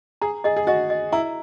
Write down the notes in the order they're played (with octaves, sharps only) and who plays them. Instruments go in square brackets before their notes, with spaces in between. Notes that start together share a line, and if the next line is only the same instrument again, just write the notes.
[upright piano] G#4 [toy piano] A#5
[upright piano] G#4 [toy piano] D#5
[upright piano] G#4
[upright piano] F#4 [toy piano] D#5
[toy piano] D#5
[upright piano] E4 [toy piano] A#5